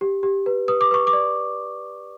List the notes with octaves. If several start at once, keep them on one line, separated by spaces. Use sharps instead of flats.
G4
G4
B4
B4 D#6
D6
B4 C#6
D6
D5